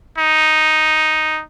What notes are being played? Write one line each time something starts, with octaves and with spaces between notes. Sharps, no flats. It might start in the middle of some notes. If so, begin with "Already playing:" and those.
D#4